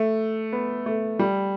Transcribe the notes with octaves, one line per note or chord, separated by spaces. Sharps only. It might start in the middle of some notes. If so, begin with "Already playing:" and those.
Already playing: A3
B3
A3
G3